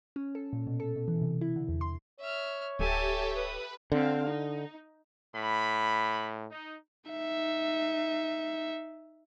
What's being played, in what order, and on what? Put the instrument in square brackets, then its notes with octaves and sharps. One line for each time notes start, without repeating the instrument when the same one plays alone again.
[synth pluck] C#4
A4
A#2
B2
A4
B2
E3
C3
E4
D3
E2
C6
[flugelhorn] C#5 [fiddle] E5 F6
[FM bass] D1 [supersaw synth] G4 A4 E5 [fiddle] G#5 A5
[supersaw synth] B4 [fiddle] D#6
[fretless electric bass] D3 [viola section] C4 F5
[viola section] D#4
[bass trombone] A2 [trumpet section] B5
[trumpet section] D#4
[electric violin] D#4 E5